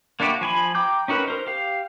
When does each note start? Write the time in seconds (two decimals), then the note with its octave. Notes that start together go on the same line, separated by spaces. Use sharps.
0.20 A#3 D4 E4 F#4 G4
0.41 F3 G#5 B5
0.75 G5 A#5 D6 G6
1.08 C#4 D#4 F#4 A#4 B4
1.28 A#4 C5
1.47 G4 F5